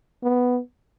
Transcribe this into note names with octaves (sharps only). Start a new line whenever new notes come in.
B3